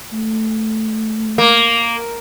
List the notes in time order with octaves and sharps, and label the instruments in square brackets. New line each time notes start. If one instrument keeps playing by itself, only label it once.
[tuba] A3
[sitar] A#3